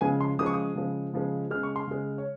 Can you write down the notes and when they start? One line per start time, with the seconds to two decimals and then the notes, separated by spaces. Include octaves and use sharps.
0.01 C#3 F3 G#3 G#5
0.21 C6
0.39 C#3 F3 G#3 D#6
0.46 C#6
0.54 D#6
0.76 C#3 F3 G#3
1.13 C#3 F3 G#3
1.51 G#3 F6
1.55 C#3
1.63 C#6
1.76 C6
1.88 C#3 G#3
2.18 C#5